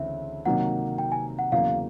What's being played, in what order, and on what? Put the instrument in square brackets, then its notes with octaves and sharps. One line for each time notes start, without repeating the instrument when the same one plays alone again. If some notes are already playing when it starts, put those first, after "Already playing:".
Already playing: [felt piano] D2 C#3 E3 C4 [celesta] E5
[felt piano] C3 D#3 F#3 A#3 [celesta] F#5
[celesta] G5
G#5
F#5
[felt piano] E2 C#3 F#3 A#3 [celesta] F5